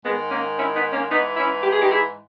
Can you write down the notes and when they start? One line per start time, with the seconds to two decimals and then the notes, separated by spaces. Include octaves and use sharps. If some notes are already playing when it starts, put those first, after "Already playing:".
0.03 G#2 D#3 G#3 B3
0.30 A#3 C#4
0.56 C#4 E4
0.74 B3 D#4
0.92 A#3 C#4
1.10 G#2 E3 B3 D#4
1.36 C#4 E4
1.63 G4
1.72 G#4
1.81 D#4 G4
1.89 E4 G#4